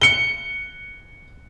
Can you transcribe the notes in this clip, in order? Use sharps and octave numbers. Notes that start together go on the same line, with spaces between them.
C#7 G7